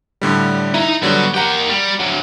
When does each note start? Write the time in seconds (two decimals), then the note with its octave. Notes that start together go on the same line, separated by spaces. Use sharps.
0.21 A2 D3 G3
0.74 D#4 E4 A#5
1.03 D3 F#3 G3 B3 F#4
1.34 A#3 G4 F#5 G5 A#5
1.70 G3
2.00 D2 F#3